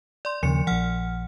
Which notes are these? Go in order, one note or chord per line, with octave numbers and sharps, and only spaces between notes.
D5 C6
D#2 C#3 F3 C#7
A#1 F3 F#5 F6